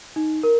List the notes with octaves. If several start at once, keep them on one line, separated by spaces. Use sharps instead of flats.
D#4
A#4